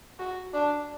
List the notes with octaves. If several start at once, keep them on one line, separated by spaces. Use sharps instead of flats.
F#4
D4